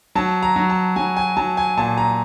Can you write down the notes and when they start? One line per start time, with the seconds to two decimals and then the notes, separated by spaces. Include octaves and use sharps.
0.15 F#3 A5
0.42 A#5
0.56 F#3
0.70 A5
0.96 F#3 G#5
1.17 G#5
1.37 F#3 A5
1.57 G#5
1.77 A#2 A5
1.98 A#5